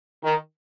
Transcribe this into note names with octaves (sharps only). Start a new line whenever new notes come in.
D#3